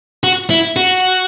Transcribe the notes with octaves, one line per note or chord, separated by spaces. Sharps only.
F#4
E4
F#4